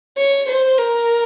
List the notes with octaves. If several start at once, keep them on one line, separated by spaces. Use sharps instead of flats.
C#5
C5
A#4